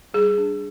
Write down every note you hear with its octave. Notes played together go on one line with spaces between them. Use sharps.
G3 G#4
D4